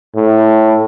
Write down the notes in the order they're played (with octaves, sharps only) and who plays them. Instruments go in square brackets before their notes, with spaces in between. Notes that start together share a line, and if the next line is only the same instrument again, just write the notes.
[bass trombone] A2